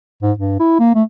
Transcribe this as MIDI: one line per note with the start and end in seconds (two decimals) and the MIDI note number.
0.22 0.32 44
0.38 0.55 43
0.59 0.79 64
0.79 0.92 58
0.95 1.03 57